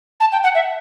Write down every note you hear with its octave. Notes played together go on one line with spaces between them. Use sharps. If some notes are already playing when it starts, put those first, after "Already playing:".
A5
G5
F#5
E5